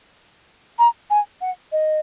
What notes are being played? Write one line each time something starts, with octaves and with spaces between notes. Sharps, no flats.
A#5
G#5
F#5
D#5